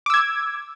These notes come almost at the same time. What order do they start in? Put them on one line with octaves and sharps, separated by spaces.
D6 E6 G#6